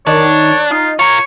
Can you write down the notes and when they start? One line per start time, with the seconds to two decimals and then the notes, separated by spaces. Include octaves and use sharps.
0.07 D#3 D4 C#5
0.71 D#4 F4
0.99 F4 A#4 C#5 C#6